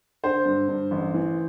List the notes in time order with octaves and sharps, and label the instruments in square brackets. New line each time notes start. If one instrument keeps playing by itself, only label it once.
[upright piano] D3 C5
G2
G2
A1
E3